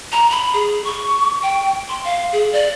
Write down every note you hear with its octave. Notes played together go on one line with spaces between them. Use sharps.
A#5
B5
G#4
C#6
G5
C6
F5
G#4
D5